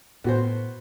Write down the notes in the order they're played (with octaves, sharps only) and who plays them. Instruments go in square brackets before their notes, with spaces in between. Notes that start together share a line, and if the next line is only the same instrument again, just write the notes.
[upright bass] A2 [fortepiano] B3 F#4 C5